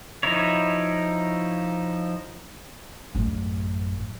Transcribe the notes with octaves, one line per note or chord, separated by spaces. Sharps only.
F3 D#4 E4 C#5
A1 F#2